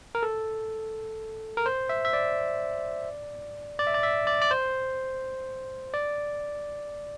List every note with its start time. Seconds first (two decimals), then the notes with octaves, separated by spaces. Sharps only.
0.15 A#4
0.23 A4
1.57 A#4
1.66 C5
1.89 E5
2.05 E5
2.13 D5
3.79 D5
3.87 E5
3.94 D5
4.03 E5
4.27 D5
4.42 D5
4.51 C5
5.94 D5